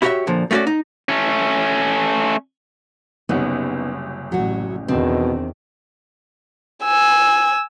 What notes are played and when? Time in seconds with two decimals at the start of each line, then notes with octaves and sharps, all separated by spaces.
0.02 E4 F#4 G4 C5 C#5 E5
0.27 A#2 D3 F3
0.51 A3 B3 C#4 F#4 D5
0.67 D#4
1.09 A3 C#4
3.29 F#1 C2 B3 C#4 D#4
4.32 A1 F#3 F#4
4.88 E2 B2 D#3 C4 D4
6.85 G#5 E6